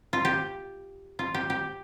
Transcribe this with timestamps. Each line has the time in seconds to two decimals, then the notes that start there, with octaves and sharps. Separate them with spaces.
0.13 F4
0.25 G4
1.19 F4
1.34 G4
1.50 G4